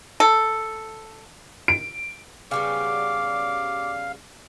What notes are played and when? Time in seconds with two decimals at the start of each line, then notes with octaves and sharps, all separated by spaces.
0.20 A4
1.68 D7
2.51 C#3 G3 B3 F5 D6